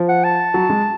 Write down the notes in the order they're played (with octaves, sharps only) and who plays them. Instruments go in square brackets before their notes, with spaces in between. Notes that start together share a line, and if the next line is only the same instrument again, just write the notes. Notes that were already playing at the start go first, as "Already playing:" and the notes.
Already playing: [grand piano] F3
[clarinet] F#5
A5
[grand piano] F#3
G#3